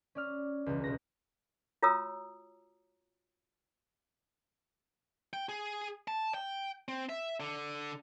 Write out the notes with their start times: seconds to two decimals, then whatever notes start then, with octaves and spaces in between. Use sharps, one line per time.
0.15 C#4 D5 F6
0.66 E1 C#2
0.84 B1 F#5 A#6
1.83 F4 F#4 C#5 A#5 D#6 E6
5.34 G5
5.49 G#4
6.08 A5
6.34 G5
6.88 C4
7.09 E5
7.40 D3